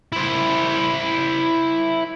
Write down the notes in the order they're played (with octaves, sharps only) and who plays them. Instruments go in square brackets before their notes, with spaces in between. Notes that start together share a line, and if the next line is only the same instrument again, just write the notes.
[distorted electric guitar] E4 C5